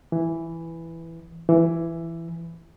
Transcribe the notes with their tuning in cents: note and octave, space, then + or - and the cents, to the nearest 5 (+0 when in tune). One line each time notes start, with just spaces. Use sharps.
E3 +5
E3 +15